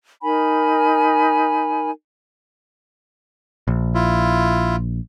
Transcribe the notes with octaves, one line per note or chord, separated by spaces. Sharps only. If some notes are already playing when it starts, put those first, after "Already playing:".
D#4 A#4 G#5 B5
A#1
E4 F4